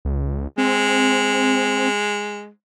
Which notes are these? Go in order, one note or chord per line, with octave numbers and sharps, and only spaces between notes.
C#2
G#3 C4